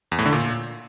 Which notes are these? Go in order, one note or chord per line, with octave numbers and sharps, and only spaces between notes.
E2
A2
D3
A#2